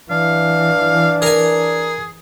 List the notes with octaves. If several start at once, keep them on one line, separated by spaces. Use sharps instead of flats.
E3 D4 F5
G#4 A#4 G#5